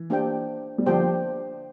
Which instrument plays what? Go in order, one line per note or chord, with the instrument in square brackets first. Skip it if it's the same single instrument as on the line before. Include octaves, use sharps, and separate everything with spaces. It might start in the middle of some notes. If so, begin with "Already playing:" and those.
Already playing: [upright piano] E3
[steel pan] A#3 D4 G4 C5 G5
[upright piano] G3
[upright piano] D3 F3 [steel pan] A#3 D4 G4 C5 G5